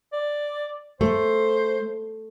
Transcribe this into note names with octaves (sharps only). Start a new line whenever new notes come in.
D5
A3 C5